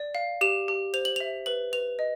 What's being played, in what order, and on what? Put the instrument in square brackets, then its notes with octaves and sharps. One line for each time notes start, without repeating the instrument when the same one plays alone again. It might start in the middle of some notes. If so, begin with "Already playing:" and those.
Already playing: [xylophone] D5
F5
G4 E7
G4
C5 F7
F#7
E5 F7
B4 F#7
B4 F7
D#5